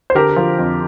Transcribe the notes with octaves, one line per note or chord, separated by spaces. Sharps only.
C5
D3 G4 A#4
F3
F2